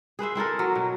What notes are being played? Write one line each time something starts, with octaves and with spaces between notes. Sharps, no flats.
G#4 B4 C5 E5
C4 E4 A4 A#4
F#3
B2